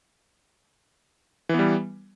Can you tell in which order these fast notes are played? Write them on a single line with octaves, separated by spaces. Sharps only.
E3 B3 G3